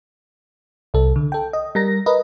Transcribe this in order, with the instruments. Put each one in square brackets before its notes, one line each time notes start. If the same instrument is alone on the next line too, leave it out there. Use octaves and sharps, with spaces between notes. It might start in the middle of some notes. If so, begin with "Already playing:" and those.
[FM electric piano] C2 A4
D3
A4 G5
D#5
G3 A#4 A#6
A#4 B4 D#5